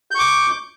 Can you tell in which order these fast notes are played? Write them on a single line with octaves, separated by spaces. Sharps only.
G6 C#6 D6